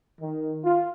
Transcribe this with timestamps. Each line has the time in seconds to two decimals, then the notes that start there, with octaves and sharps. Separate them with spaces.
0.21 D#3
0.64 F4